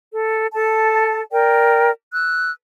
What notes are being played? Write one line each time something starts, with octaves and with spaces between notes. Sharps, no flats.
A4
A4 A5
A#4 D5 G5
E6 F#6